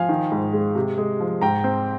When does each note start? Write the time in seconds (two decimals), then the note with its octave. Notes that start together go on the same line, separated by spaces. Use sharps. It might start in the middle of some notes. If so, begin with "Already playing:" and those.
Already playing: F3 F5 G#5
0.09 D#3
0.32 G#2
0.53 G#3
0.75 C3
0.98 G#3
1.20 F3
1.41 G#2 G5 A#5
1.64 C4